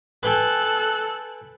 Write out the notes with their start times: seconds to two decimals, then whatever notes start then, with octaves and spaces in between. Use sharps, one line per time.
0.23 A4 B4 G5 G#5 F#6